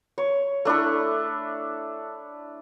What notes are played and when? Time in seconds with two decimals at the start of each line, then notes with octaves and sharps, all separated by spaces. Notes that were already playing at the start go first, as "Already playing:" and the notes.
0.18 C#5
0.65 A3 D4 E4 A4